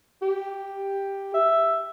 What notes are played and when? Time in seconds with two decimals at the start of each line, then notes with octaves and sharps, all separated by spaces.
0.22 G4
1.34 E5